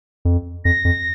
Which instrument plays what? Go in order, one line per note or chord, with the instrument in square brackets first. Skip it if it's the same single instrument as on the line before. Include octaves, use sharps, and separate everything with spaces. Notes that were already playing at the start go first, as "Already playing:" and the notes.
[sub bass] F2
[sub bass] F2 [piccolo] A#6
[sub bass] F2